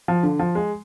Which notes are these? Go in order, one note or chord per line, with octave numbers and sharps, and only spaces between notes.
F3
D3
F3
G#3